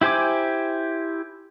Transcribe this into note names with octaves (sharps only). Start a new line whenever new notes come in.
E4 G4 C5 G#5 D6